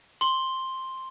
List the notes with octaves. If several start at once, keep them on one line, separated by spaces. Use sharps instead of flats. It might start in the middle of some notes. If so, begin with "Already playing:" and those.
C6 G7